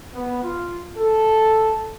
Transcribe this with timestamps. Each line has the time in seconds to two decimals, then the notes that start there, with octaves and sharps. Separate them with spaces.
0.14 B3
0.44 F4
0.98 A4